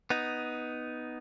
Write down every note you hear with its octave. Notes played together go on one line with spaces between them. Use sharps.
B3 D#4